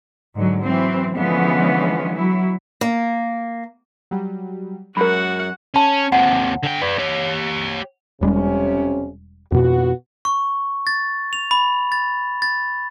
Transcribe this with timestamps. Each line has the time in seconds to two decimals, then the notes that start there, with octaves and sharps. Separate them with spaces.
0.35 G#2 D3 F#3
0.64 E3 F#3 C4
1.15 D3 E3 F3 G#3 B3 C#4
2.14 F#3 E4
2.81 A#3
4.11 F#3 G3
4.97 F#2 G#3 F#4 A#4 F#5 B5
5.76 C#4 A5
6.12 D#2 C3 F#5
6.64 D3 G5
6.82 B4 D5
6.98 G4 C#5
8.21 E1 F2 C3 G3 G#3 C#4
9.52 F2 B2 B3 F4 F#4
10.25 C#6
10.87 A6
11.33 F7
11.51 B5
11.92 A6
12.42 A6